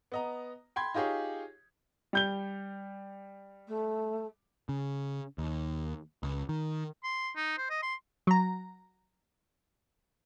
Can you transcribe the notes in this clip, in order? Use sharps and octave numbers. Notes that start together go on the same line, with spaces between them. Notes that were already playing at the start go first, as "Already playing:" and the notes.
B3 D#5 A#5
G5 B5 C6 G#6
D#4 F4 G4 G#4 C#5
G3 G6 G7
A3
C#3
D#2
C#2
D#3
C6
D#4
C5
D#5
C6
F#3 A#5